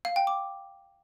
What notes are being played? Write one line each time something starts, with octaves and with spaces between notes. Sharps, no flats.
F5
G5
D6